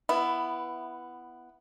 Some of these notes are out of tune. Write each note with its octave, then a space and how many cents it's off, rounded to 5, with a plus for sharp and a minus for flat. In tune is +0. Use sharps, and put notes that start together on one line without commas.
B3 +0 E4 +15